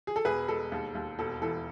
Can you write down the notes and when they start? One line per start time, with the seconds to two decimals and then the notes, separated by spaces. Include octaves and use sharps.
0.07 G#4
0.16 A4
0.25 E1 G#4 B4
0.48 G#3 A4
0.72 D#2
0.95 D#2
1.19 E1 A4
1.42 E3 A4